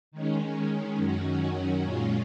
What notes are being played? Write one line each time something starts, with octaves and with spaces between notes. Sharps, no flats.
D#3 G#3 C#4
F#2 D#3 F#3 C#4 F#4
A#2 G#3 C#4 F4